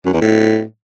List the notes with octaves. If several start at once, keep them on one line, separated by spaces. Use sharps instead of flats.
F#2
E2
A2